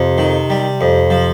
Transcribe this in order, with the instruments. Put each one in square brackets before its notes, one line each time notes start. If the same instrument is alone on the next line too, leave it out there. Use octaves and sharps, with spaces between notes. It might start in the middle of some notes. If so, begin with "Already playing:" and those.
Already playing: [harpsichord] F2 [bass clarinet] C3
[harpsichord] D#3
G3
F2
F3